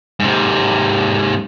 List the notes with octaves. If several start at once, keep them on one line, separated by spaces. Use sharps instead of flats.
G#2 C3